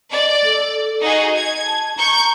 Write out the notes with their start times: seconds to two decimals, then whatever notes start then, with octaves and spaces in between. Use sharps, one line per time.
0.12 D5 D#5
0.44 A4
1.01 D#4 F#4 G#4 D#5
1.35 G#6
1.67 A5
1.97 A#5 C#6 G6